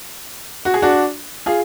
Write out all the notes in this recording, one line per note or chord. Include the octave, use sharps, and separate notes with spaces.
F#4
G#4
D4 F#4
F4 G#4